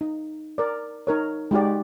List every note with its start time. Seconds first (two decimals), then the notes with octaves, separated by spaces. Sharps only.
0.01 D#4
0.58 A#4 D5
1.07 D#4 A#4 C#5
1.51 G#3 D#4 F#4 G4 D5